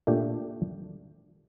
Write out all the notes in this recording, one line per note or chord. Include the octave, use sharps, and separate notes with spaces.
A#2 A3 D4 G4